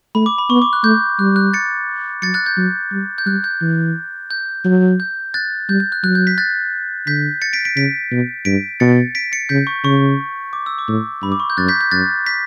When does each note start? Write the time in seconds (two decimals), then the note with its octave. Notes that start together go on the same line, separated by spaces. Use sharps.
0.15 A3 B5
0.26 D6
0.38 B5
0.50 B3 C#6
0.62 D6
0.73 F#6
0.84 A3 G6
1.19 G3 F#6
1.36 F#6
1.53 A6 C#7
2.22 F#3 A6 C#7
2.34 F#6 A6
2.46 G6
2.57 F#3
2.92 G3
3.18 G6
3.26 G3 F#6
3.44 G6
3.62 E3
4.31 G6
4.65 F#3
5.00 G6
5.34 F#6 A6
5.69 G3 G6
5.80 G6
5.92 F#6
6.04 F#3 F#6
6.15 G6
6.27 G6 B6
6.38 F#6 A6
7.07 D3 G6 B6
7.42 A6 C#7
7.53 B6 D7
7.65 B6 D7
7.76 C#3 B6 D7
8.11 B2
8.45 G2 B6 D7
8.80 B2 A6 C#7
9.15 B6 D7
9.32 A6 C#7
9.49 C#3 G6 B6
9.67 C#6
9.84 C#3 C#6
10.53 D6
10.66 E6
10.79 D6
10.88 A2
11.23 G2 B5
11.32 D6
11.40 C#6
11.50 G6
11.57 F#2 F#6 A6
11.68 G6 B6
11.81 G6
11.91 F#2 F#6 A6
12.26 G6 B6